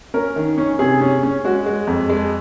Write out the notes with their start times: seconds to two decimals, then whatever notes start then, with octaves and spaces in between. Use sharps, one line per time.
0.14 C#4 A#4
0.36 D#3
0.58 C#4
0.79 C3 G#4
1.01 C#4
1.23 C#4
1.45 G#3 F#4
1.66 G#3
1.87 F2
2.09 G#3